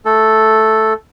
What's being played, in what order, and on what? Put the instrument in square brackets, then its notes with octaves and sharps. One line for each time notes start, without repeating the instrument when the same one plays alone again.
[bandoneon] A3 A4